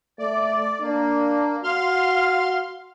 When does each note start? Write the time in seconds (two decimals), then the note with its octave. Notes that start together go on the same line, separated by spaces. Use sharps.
0.19 A3 D5
0.82 A#3 D4
1.64 F#4 F5 C6 F6